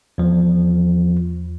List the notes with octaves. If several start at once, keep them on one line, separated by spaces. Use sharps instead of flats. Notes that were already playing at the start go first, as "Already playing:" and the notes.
E2 F3